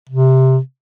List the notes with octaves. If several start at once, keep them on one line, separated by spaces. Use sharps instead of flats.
C3